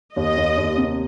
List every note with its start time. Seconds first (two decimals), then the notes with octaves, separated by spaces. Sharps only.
0.16 D#2 D#5
0.37 D#2
0.57 D#2
0.78 C3